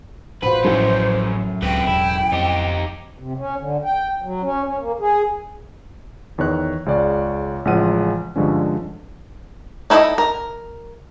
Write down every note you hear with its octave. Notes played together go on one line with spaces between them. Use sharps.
A1 A#2 F#4 B4 C5 B5
A1 F#2 A2 F3 F#3 A3 C#4
C#2 C4 B4 G5
E1 E4
F2 D#4 G4
C3
C#4
D3
G5
F#3
C#4
C#4
A#3
G#4
E2 D#3 C#5 F#6
C#2 C#3 C#5 D5
A1 C#3 F3 G#3 F#5 D#7
G2 D3 F3 G#3 C#4
D#4 E4 A4 B4 D#5
A#4